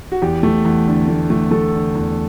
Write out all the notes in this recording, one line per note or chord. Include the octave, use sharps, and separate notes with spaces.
F#4
E2 G4
A3
E2
D3
A3
A3
A3 A4
D3
E2